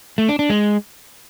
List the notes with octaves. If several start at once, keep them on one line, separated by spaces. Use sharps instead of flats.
A3
D4
D4
G#3